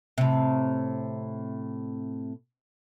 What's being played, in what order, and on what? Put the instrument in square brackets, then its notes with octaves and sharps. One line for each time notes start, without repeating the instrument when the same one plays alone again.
[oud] A2 C3